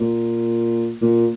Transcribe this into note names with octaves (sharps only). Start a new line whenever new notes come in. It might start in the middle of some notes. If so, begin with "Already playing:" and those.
Already playing: A#2
A#2